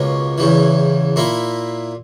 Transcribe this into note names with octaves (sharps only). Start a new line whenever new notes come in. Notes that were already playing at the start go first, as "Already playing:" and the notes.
Already playing: C#2 B2 A#3 C#4
E2 C#3 E3
A#2 A#3 E4